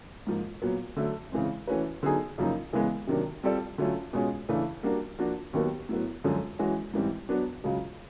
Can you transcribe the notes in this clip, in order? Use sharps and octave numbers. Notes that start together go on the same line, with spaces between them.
G#2 F3 A#3
A#2 F#3 B3
D3 F#3 A3
C#3 E3 G#3 C4
E3 A3 C#4 F#4 B4
D3 F#3 B3 D#4 G#4
F#2 C#3 F3 A#3 D#4
C#3 E3 G#3 B3
C3 D#3 F#3 A#3 D4
G3 C4 F4 A4 D5
D3 F#3 A3 C#4 F4
B2 G#3 C#4 F4 G#4
C#3 E3 A3 D4
G3 A#3 D4 F#4 A#4
F3 A#3 D4 F#4
D#2 D#3 F#3 B3
A2 F#3 B3
F#2 D3 F3 G#3 C#4
E3 G#3 C#4 F#4
G#2 E3 G3 C4
F#3 B3 D4 F#4
C#2 C#3 F#3